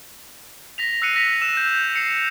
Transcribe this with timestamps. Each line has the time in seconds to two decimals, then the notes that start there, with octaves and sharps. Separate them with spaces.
0.78 A#6 B6 F7
1.02 E6 F#6 C7 C#7 D#7
1.16 A#6 B6 F7
1.41 E6 E7
1.57 G6
1.94 C7 C#7 F7